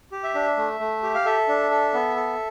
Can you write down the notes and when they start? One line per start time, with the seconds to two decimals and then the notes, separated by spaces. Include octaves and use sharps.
0.12 G4
0.23 E5
0.35 D4
0.57 A3
0.80 A3
1.03 G4
1.15 F5
1.25 A4 E5
1.48 D4
1.71 A4
1.93 B3
2.16 A4